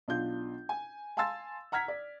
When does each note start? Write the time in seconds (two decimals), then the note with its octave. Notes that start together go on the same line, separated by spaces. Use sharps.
0.08 B1 D4 F4 G6
0.69 G#5
1.17 F5 G#5 A5 C6 E6 A6
1.72 F#5 A#5 F6 G#6 B6
1.88 D5